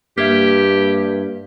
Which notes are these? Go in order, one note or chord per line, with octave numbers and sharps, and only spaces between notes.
G2 A#3 G4 E5 G#6 B6